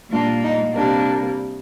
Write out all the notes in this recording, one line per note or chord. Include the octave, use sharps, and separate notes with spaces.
A#2 G3 A#3 D4 F4
D#4
C3 G3 A#3 D4